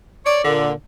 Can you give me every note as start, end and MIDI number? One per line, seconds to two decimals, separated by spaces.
0.25 0.40 73
0.25 0.40 74
0.44 0.70 46
0.44 0.70 50